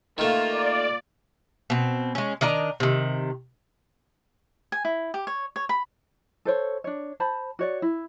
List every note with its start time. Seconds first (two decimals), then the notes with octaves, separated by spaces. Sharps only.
0.18 D#3 A3 A#3 F4
0.52 D5
1.70 B2 C4
2.15 G#3 C#4
2.41 D#3 D4 D#5 A#5
2.80 C3 D#3
4.72 G#5
4.85 E4
5.14 G4
5.27 C#5
5.56 C#5
5.69 B5
6.45 A4 C5 C#5
6.84 D4 C#5
7.20 C5 A5 B5
7.59 F#4 C#5 D5
7.82 E4